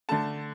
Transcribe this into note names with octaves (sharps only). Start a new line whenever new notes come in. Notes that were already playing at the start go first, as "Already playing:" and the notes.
D3 A3 A5